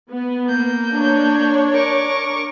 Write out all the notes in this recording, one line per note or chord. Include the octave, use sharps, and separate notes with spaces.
B3
A#3 G6
D4 C#5
A#4 C#6 D6